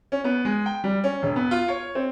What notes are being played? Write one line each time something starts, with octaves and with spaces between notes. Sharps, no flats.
C#4
B3
G#3
G5
G3
C#4
E1
B3
F4
C#5
C4